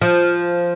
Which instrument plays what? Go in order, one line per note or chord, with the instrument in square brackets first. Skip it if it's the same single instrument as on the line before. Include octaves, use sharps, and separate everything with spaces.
[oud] F3